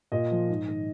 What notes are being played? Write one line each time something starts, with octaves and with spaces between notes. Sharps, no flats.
A#2 D#5
F3
G#2
D#3